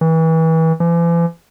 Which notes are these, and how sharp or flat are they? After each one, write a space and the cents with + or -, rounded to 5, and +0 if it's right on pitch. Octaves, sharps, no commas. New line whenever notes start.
E3 -30
E3 +45